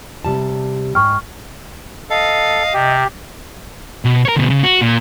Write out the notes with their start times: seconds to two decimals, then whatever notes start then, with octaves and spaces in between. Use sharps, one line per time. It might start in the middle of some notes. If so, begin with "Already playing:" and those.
0.25 C3 G3 A5
0.95 G#2 G5 C#6 F6
2.10 A4 D#5 F5
2.73 C3 G4
4.05 B2
4.25 A#4 C#5
4.36 D2 B2
4.50 C#3
4.63 F#4
4.82 A#2